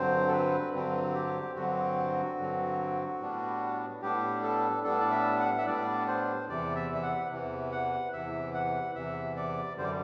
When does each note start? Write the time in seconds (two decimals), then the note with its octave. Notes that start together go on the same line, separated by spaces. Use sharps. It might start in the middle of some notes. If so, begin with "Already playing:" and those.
Already playing: G2 D3 F#3 C4 C5
0.28 A4
0.32 B4
0.73 G2 D3 F#3 C4
1.14 G4
1.55 G2 D3 F#3 C4 F#4
2.38 G2 D3 F#3 C4
3.20 A2 G3 B3 D4
4.02 A2 G3 B3 D4 G4
4.43 A4
4.84 A2 G3 B3 D4 A4
5.00 D5
5.11 E5
5.40 F#5
5.58 E5
5.67 A2 G3 B3 D4 D5
6.08 C5
6.48 E2 C3 E3 D5
6.75 E5
6.95 E5
7.03 F#5
7.31 E2 C3 E3
7.72 F#5
8.13 E2 C3 E3 E5
8.54 F#5
8.95 E2 C3 E3 E5
9.36 D5
9.77 F#2 D3 G3 C5
9.84 D5